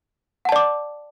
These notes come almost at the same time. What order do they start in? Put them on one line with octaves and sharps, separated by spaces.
F#5 A5 D5 D6